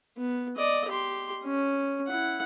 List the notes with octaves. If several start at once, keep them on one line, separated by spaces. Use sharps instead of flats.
B3
D5 D#5
G4 C6
C#4
E4 F#5